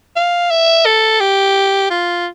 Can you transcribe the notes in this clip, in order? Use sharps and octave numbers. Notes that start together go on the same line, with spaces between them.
F5
E5
A4
G4
F4